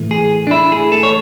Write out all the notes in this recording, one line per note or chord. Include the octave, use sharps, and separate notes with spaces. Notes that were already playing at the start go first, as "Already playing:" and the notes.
Already playing: A2 E3 A3
G#4
D4
E4
G#4
A4
C#5